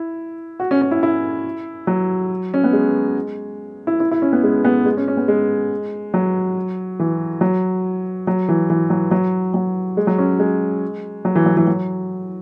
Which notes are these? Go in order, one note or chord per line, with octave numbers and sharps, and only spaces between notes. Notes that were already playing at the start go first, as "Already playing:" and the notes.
Already playing: E4
F#4
C#4
C#4
E4
E4
F#3
C#4
B3
G#3
E4
E4
E4
C#4
B3
G#3
B3
G#3
C#4
C#4
B3
G#3
F#3
E3
F#3
F#3
E3
E3
F#3
F#3
F#3
G#3
F#3
C#4
G#3
F#3
E3
F#3
E3
F#3